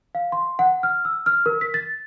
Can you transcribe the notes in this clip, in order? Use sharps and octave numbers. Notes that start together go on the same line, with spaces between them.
F5
C6
F#5
F6
E6
F6
A#4
B6
A6